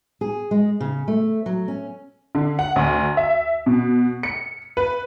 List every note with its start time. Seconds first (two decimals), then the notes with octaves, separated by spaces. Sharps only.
0.21 G#4
0.51 G#3
0.80 C#3
1.08 A3
1.46 F#3
1.68 C#4
2.35 D3
2.59 F#5
2.76 D2
3.17 E5
3.66 B2
4.23 C#7
4.77 B4